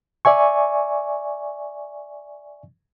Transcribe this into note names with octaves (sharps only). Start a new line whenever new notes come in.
D5 E5 G#5 C#6